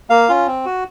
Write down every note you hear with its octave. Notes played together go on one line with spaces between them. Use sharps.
A#3 F5
C#4 F4
C4
F#4